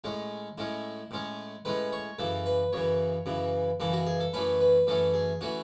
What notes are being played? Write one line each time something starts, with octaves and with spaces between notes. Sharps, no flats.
A2 G#3 C#4
A2 G#3 C#4 E4
A2 G#3 C#4
A2 G#3 C#4 B4
C#5
F#2 C#3 E3 A4
B4
F#2 C#3 E3 C#5
F#2 C#3 E3
F#2 C#3 E3 A4
F#4
G#4
A4
F#2 E3 A3 C#4 B4
B4
F#2 E3 A3 C#4 A4
G#4
E3 A3 C#4 F#4